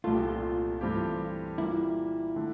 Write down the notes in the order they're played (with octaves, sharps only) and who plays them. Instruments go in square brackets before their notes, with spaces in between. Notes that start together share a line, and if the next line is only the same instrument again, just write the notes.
[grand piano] C2 A#2 A3 [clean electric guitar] F4
[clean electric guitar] G4
F4
[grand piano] G2 E3 A3 C4 G4
[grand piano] A#2 G3 A#3 [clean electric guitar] E4
[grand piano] D3 A3